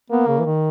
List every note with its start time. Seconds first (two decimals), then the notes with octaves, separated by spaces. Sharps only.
0.10 A#3 B3
0.28 C#3
0.39 E3
0.45 D#3